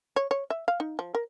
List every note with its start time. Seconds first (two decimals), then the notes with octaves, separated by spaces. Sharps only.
0.16 C#5
0.31 C#5
0.50 E5
0.68 F5
0.80 D#4
0.99 F3
1.15 A#4